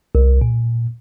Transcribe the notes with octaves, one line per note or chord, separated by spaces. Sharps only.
C2
A#2